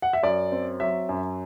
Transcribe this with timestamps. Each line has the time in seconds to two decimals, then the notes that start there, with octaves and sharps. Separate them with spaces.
0.02 F#5
0.13 E5
0.23 F#2 D5
0.52 C4
0.80 F#3 E5
1.09 F#2